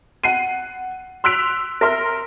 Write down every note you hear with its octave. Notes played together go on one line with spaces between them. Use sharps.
F#5 C7 D#7
C6 E6 F#6 B6 D7 F7
A#4 E5 C6 F6